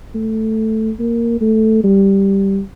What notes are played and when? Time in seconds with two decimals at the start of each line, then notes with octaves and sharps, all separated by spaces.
0.15 A3
0.99 A#3
1.41 A3
1.84 G3